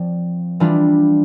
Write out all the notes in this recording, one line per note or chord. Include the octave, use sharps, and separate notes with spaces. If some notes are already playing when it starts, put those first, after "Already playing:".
Already playing: F3 C4 D5
E3 G3 D4 F4